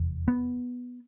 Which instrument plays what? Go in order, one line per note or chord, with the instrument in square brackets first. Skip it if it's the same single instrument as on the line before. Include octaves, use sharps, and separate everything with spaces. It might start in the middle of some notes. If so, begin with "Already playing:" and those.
Already playing: [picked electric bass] F1 E2
B3